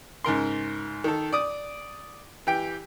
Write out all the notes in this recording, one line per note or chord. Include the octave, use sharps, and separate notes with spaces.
G#2 C#3 A#4 C6
D#3 A4
D5 D#6
E3 G4 G5